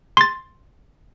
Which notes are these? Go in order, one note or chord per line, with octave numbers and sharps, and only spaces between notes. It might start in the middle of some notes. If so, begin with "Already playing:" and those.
C6 A6